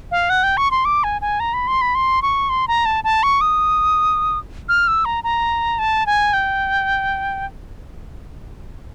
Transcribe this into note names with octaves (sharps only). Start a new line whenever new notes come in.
F5
F#5
G5
C#6
C6
D6
G#5
G#5
A#5
B5
C6
B5
C6
C#6
C6
A#5
A5
A5
C#6
D#6
F6
E6
A#5
A#5
A5
G#5
G5